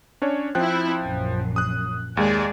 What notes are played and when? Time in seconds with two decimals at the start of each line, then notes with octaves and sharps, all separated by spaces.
0.22 C#4 D4 C#5
0.55 F3 C4 E4 G5 F#6
1.02 A#1 F#2
1.56 D#6 F#6
2.17 D#2 G#3 G#4 D5